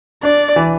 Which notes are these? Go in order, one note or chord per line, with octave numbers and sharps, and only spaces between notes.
D4 D5
E3